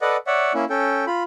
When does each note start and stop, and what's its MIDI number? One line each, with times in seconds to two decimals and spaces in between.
0.01 0.17 69
0.01 0.17 71
0.01 0.17 74
0.01 0.17 75
0.01 0.17 78
0.27 0.53 73
0.27 0.53 74
0.27 0.53 76
0.27 0.53 78
0.54 0.65 58
0.54 0.65 61
0.54 0.65 64
0.70 1.05 61
0.70 1.05 69
0.70 1.05 79
1.07 1.23 65
1.07 1.23 83